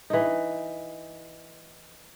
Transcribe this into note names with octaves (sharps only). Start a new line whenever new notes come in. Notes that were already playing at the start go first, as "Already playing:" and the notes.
E3 D#4